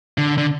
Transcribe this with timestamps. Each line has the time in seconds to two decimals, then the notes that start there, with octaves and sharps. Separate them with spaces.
0.18 D3
0.38 D3